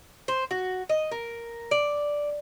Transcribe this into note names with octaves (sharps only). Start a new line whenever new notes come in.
C5
F#4
D#5
A#4
D5